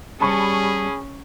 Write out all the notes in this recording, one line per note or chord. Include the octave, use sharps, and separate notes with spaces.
G3 C#4 G#4 A5 B5 C#6